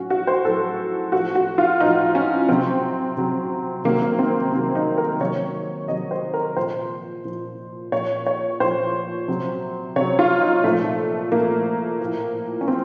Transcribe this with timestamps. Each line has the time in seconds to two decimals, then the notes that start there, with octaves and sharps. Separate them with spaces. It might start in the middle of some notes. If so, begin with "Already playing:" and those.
Already playing: A2 F#3 C#4 F#4
0.10 F#4
0.27 C5
0.45 A2 F#3 A4
1.12 A2 F3 F#4
1.35 F#4
1.58 F4
1.80 A2 F3 D#4
2.15 C#4
2.49 C3 F#3 C4
3.17 C3 F#3
3.85 C3 D#3 F#3 A#3
4.02 A#3
4.19 C4
4.52 C3 D#3 F#3
4.75 D#4
4.98 A#4
5.20 C3 D#3 F#3 C#5
5.88 C3 D#3 F#3 D#5
6.11 C5
6.34 A#4
6.57 A#2 F3 C5
7.25 A#2 F3
7.92 A#2 F3 C#5
8.27 C#5
8.60 A#2 F3 C5
9.28 C3 F#3
9.96 C3 F#3 C#5
10.19 F4
10.42 D#4
10.64 A#2 F3 A3
11.32 A#2 F3 A#3
12.00 A2 F3
12.61 C#4
12.68 F3 C4